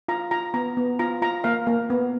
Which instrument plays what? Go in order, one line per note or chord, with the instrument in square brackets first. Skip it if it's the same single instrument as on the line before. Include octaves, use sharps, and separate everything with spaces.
[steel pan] F4 A#5
F4 A#5
B3 A#5
B3
F4 A#5
F4 A#5
A#3 F5
A#3
B3